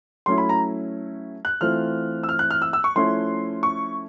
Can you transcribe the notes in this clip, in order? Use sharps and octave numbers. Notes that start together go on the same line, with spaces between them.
F#3 A3 C#4 E4 C6
B5
A#5
F#6
E3 A3 C4 F4 F6
E6
F6
F#6
F6
E6
E6
C#6
F3 A3 C#4 E4 C6
C#6